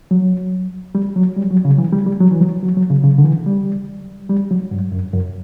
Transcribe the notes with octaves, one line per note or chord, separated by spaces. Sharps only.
F#3
G3
F#3
G3
F#3
C#3
E3
G3
G3
F#3
E3
F#3
F#3
F#3
C#3
C#3
D3
E3
G3
G3
F#3
G2
F#2
F#2